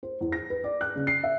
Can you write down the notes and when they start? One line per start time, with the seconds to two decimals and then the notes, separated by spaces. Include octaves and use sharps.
0.03 C5
0.21 E2
0.32 A#6
0.50 B4
0.64 D5
0.81 F#6
0.95 C#3
1.07 C7
1.23 E5